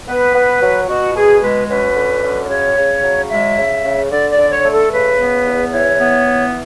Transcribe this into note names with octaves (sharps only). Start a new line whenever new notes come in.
B3 B4
B3
F#3
B2 F#4
B2 G#4
G#3 B4
F#2 B4
D3
F#2
D5
C#3 C#5
C#3
F#3
G#3 E5
C#3
C#3
D3 D5
D5
D3
C#5
A3
A4
C#3 B4
B3
E2
E3 C#5
B3
E3